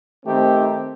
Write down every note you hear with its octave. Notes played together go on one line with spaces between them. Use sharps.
D#3 A3 C4 D#4 G4